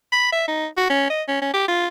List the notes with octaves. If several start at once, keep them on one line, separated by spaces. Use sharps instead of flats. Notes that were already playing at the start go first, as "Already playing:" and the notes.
B5
E5
D#4
F#4
C#4
D#5
C#4
C#4
G4
F4